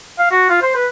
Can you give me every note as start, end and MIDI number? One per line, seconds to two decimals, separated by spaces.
0.19 0.29 77
0.31 0.46 66
0.50 0.62 65
0.62 0.72 72
0.75 0.86 71